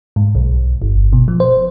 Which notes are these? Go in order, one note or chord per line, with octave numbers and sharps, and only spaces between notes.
G#2
B1
G1
B2
F3
C5